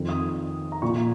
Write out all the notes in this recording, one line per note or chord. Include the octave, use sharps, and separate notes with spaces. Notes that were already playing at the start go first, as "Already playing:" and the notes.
Already playing: F2 D#3
D#6
A#5
A#2 F3 C#6